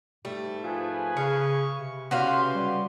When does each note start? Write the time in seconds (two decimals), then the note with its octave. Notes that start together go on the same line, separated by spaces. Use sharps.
0.25 G#2 G3 A3
0.64 F3 G#4 B4 G#5
1.17 C#3 F5 C#6
1.78 C3
2.11 C#3 F#4 G4 B4 F5 C6
2.54 G3